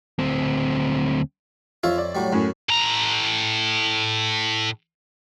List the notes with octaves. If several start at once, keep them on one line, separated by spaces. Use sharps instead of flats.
D2 C4
F2 F4 C#5 E5
D5
A2 F#3 G3
F#2 A2 C#4
A2 A#5